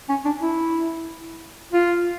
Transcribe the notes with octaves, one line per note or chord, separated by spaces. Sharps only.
C#4
D4
E4
F4